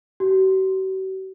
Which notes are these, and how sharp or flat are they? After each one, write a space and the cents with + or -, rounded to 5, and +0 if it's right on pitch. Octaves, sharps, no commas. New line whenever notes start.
F#4 +45